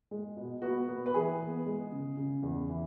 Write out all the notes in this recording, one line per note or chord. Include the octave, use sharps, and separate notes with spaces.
G#3
B2
B3 F#4
B3
B4
E3 G#4
B3
G#3
C#3
C#3
E2
E3